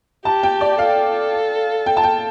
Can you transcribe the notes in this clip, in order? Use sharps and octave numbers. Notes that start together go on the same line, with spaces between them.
G4 A5
G5
D5
A4 F5
G5
A5
G5